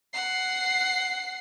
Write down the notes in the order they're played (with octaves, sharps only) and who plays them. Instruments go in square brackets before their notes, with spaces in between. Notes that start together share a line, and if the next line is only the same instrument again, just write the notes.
[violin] F#5 C7